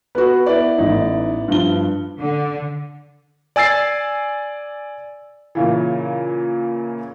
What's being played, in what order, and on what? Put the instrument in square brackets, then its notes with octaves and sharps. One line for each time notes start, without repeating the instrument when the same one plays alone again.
[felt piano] B3 F#4 [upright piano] B4
[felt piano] B3 E4 D5
[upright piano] A1 D#4
G2 F3 G7
[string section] D3
[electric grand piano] D5 G#5 E6 A6 C7
[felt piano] A#2 C#3 E3